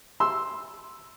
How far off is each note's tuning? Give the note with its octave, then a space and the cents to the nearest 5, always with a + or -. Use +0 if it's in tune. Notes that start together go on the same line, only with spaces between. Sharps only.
C6 +0 E6 +0